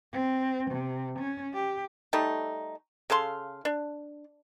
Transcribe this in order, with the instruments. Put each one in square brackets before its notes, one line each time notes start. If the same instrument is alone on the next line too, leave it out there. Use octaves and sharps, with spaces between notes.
[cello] C4
C3
C#4
G4
[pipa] G3 A3 D#4
C#3 A4 F5 C6
D4